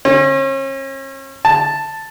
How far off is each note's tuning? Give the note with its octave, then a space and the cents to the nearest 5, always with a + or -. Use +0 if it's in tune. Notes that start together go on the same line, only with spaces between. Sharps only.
C#4 -40
A5 +5